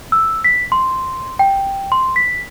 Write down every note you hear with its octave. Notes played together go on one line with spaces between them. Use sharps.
E6
B6
C6
G5
C6
B6